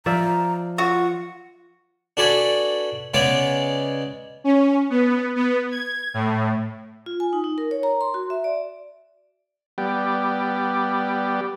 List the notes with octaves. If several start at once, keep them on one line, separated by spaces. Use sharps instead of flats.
F3 D5 E5 A#5
F4 F#4
D4 F#4 A4 B4 D5 G#5
C#3 G#3 B3 D5 G#5 D6
C#4
B3
B3
G#6
A2
F4
G#5
D#4
D#4
A#4
C#5
A#5
C6
F#4
E5
D5
G3 B3 G4 D5